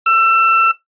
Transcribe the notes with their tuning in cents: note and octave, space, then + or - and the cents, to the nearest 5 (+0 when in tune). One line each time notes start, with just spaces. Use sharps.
E6 +25